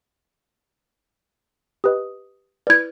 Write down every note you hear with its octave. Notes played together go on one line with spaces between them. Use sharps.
G4 B4 D#5 D#6
E4 B4 D5 G#6